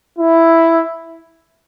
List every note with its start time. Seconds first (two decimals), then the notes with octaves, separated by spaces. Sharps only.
0.18 E4